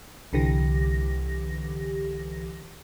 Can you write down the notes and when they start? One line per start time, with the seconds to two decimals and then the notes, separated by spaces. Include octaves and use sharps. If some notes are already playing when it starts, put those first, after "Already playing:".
0.33 C2 D3 E3 G4 A#6